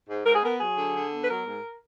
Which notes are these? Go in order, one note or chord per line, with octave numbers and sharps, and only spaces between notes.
G#2
G#2 A#4
G#4
B3 A#4
F#3 G#4
D3
D3
B3
B4
F#3 A#4
G#2